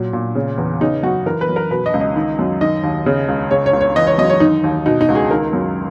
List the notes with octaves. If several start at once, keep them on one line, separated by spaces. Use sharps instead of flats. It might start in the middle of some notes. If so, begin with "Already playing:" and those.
Already playing: A#2 F#3
A#2
C#3
E2
C#3 D#4
F#2 F#4
E3 A#4
B4
F#2
A#4
B2 B4
D#5
C#2
D#5
D#3
F#2
D#3 D#5
D#2
C#3
C#2
C#3 C#5
C#5
C#2
C#5
E3 D#5
C#5
F#2 D#5
C#5
D#3 D#4
D#2
B2 D#4
D#4
C#2 F#4
G#4
D#3 A#4
F#2